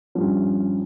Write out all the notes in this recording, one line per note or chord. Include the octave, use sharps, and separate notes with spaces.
G2 F3 C#4